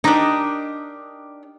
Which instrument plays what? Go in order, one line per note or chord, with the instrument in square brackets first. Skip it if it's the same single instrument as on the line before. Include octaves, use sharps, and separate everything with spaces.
[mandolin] D4 G4 A#4 D#5 [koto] D#4